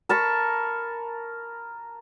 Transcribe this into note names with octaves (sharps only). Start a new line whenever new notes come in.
A#4 A5 B5 C#6